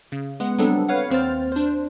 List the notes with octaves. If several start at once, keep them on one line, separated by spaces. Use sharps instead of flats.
C#3
G#3 B3 F#5
F#3 G3 B3 C4 D4 A4
B4 C#5 F5 F#5
D#2 C4 C5 F6 A6
D4 C5